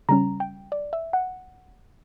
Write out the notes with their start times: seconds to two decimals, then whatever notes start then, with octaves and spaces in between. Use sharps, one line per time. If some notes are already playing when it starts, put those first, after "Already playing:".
0.09 C#3 G3 C#4 A#5
0.40 G5
0.72 D5
0.93 E5
1.13 F#5